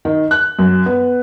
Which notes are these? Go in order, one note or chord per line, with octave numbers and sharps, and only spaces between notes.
D#3
F#6
F#2
B3